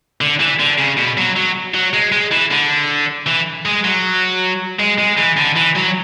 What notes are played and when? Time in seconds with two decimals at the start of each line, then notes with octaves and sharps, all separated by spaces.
0.21 D3
0.40 E3
0.60 D3
0.79 C#3
0.97 B2
1.18 F#3
1.36 F#3
1.74 F#3
1.94 G#3
2.12 G#3
2.31 E3
2.51 D3
3.27 E3
3.65 G#3
3.84 F#3
4.80 G#3
4.99 G#3
5.18 E3
5.37 D3
5.56 E3
5.75 F#3